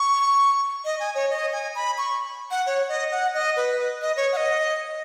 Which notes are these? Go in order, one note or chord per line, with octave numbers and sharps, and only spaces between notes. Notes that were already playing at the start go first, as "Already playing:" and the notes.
Already playing: C#6
D#5
G#5
C#5
D#5
G#5
B5
C#6
F#5
C#5
D#5
F#5
D#5
B4
D#5
C#5
F#5
D#5